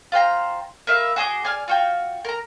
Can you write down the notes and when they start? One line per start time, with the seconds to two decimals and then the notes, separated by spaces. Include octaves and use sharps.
0.12 F4 C5 G5 A#5
0.87 A#4 B4 E5 F5
1.16 F#4 G#4 D#5 D6
1.44 G#4 D5 G#5 F6
1.68 F4 F#4 G5
2.25 A#4 A#5